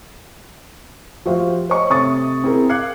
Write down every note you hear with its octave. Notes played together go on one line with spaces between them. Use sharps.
F3 F#4 G4 C5 E5 F5
C5 C#5 D#5 C#6
C3 A3 C#6 D#6 A6
C4 E4 G#4 A#4
F5 D6 F#6 G#6 C7 C#7